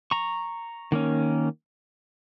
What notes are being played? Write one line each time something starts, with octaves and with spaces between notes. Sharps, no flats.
A#5 C#6
D#3 A#3 C#4